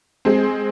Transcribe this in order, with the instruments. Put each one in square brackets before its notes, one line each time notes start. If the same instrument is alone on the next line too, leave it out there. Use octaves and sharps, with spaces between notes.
[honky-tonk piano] G#3 C4